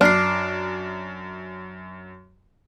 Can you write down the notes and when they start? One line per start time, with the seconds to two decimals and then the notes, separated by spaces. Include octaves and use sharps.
0.01 F#2 D4 F6 C7